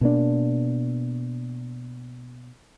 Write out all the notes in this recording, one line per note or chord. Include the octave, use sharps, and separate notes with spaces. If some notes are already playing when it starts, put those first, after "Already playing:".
B2 A#3 D4